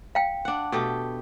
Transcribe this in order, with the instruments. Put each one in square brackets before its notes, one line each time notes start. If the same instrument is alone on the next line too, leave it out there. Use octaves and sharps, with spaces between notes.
[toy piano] F5 G5
[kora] D4 F#5
B2 A3 G4